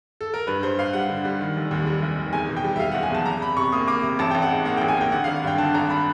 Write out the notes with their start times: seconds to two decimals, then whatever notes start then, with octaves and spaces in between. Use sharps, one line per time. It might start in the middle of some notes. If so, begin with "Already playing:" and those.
0.21 A4
0.34 A#4
0.47 G2 B4
0.63 G2 C5
0.79 G2 F5
0.93 G3 F#5
1.09 D3
1.25 G3
1.41 D#3
1.56 F1
1.71 D#2
1.87 G3
2.02 F1
2.18 D#3
2.33 E2 G#5
2.49 B2
2.57 G5
2.64 G3
2.76 E5
2.79 G3 F5
2.92 F#1 F#5
3.03 G#5
3.11 E2 A5
3.26 E2 A#5
3.41 C3 B5
3.57 C3 C#6
3.72 A#3 D#6
3.88 A#3 D6
4.03 C3
4.19 A1 A5
4.31 A1 G5
4.42 F#5
4.51 G#2
4.65 A#3 F#5
4.77 A1 G5
4.88 G#5
4.97 A#3 G5
5.12 D3 F#5
5.24 G#1 F5
5.36 F#5
5.43 G2 G5
5.58 D3 A5
5.74 G#1 A#5
5.90 B5